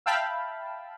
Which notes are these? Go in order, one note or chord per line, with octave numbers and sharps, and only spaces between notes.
E5 F5 G5 A5 B5